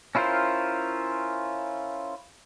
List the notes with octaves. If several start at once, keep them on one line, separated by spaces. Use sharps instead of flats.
C#4 E4 F4 A#4 C5